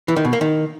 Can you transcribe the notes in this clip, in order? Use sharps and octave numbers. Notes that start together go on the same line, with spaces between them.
E3
D#3
B2
A#3
D#3